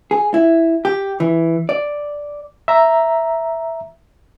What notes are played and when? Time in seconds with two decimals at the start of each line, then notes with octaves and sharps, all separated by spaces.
0.11 G#4
0.34 E4
0.85 G4
1.20 E3
1.69 D5
2.68 E5 A#5